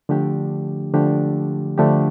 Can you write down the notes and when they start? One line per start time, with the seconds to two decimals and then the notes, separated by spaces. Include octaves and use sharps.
0.09 D3 F3 A3 D4 G4
0.94 D3 F3 A3 D4 G4
1.78 D3 F3 A3 D4 G4